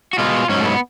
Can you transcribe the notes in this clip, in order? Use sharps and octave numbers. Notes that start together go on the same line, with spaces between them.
F#4
B2 G#3 F4
G#2 F#3 C#4
A3
B3